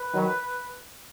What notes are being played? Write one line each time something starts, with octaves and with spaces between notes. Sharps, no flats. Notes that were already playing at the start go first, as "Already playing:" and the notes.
Already playing: B4
D#3 F#3